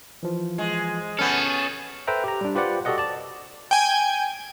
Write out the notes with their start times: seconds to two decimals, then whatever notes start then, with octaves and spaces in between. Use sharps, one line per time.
0.23 E3 F3
0.58 G#3
1.19 B3 C#4 G#4 A4 F6 G6
2.07 A4 B4 C5 E5 G5 A#5
2.24 G4 A#5
2.41 G3 D4
2.55 F4 G4 B4 C5 D5 F#5
2.85 F#4 G4 A4 D5 D#5 F#5
2.98 D5 A5
3.71 G5 G#5